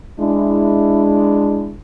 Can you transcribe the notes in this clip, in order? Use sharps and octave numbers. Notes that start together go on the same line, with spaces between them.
G#3 D4 E4